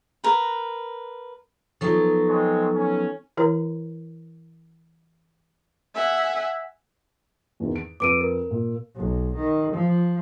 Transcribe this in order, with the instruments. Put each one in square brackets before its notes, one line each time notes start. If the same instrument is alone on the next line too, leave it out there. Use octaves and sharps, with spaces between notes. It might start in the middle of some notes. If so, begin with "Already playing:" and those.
[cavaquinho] A#4 B4
[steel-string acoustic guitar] F3 F#3 B3 [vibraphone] D#4 A4 C#6
[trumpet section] G#3 C4 C#5
C#4
[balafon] E3 E4 A#4 C#5 A#5
[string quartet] E5 F#5 G#5
[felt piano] E2 D#3
D7
[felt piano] F2 B4 E6 [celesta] D6 D7 D#7
[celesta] A#4
[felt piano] A#2
[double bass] B1
D#3
F3